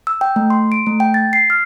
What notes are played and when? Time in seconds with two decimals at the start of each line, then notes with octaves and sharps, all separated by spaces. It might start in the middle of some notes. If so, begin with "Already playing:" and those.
0.07 E6
0.21 G5
0.36 A3
0.50 C6
0.72 D7
0.86 A3
1.00 G5
1.14 A6
1.33 C7
1.50 F6